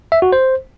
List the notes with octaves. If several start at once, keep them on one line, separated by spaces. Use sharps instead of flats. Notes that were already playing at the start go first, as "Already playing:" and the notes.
E5
F#4
C5